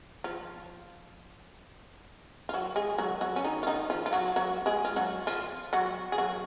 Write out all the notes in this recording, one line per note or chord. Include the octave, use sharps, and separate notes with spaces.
F3 F4
F4
F#3 F#4
G#3 G#4
F#3 F#4
F#3 F#4
C#4
D#3 D#4
F4
D#3 D#4
F3 F4
F4
F#3 F#4
F#3 F#4
G#3 G#4
F4
F#3 F#4
F3 F4
F#3 F#4
G#4
F#3 F#4